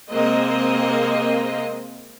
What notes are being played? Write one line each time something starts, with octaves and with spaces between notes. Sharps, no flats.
C3 G#3 A#3 C4 D#5